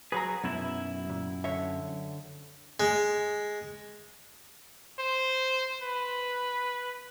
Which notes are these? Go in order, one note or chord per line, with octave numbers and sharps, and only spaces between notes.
F#3 G#4 B4 A#5
B1 F#2 B2 E4
A#2
D3 C#5 E5
G#3
C5
B4